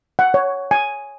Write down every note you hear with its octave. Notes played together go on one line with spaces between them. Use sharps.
F#5
C#5
G#5